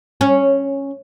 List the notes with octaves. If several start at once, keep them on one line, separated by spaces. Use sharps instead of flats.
C#4